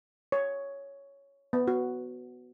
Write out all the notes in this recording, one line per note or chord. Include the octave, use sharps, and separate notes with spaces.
C#5
B3
F#4